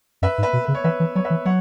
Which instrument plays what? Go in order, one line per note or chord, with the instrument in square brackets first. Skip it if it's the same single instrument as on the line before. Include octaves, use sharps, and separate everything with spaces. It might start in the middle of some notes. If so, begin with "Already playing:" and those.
[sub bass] F#2 [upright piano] B4 E5
[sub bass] G#2
[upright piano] B4 E5
[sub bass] B2
[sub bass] C#3 [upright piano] B4
[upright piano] C#5
[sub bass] E3 [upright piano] B4 E5
[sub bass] E3
[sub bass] F#3 [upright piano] C#5
[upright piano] B4 E5
[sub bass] E3
[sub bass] F#3 [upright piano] C#5 F#5